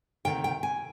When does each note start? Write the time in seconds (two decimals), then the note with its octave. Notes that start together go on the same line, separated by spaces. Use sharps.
0.25 D2 C3 D#3 G5
0.44 G5
0.63 G#5